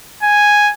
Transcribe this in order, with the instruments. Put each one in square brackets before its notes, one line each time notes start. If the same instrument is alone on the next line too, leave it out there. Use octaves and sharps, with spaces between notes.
[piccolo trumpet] G#5